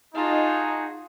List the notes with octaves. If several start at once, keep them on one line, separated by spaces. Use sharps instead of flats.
D#4 F4 F#4 G#4 A5